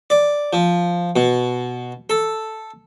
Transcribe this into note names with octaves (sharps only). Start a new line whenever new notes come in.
D5
F3
B2
A4